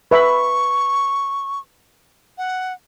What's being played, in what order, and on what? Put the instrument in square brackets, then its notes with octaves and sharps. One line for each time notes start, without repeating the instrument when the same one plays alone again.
[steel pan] B4 E5 B5 [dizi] C#6
[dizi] F#5